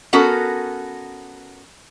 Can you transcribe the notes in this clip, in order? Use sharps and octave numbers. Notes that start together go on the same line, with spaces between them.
B3 C#4 F#4 A4 A#4